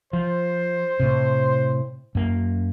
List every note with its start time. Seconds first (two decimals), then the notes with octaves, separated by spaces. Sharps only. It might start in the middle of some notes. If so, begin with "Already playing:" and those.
0.13 F3 C5
1.00 A2 C3
2.15 F#2 A#3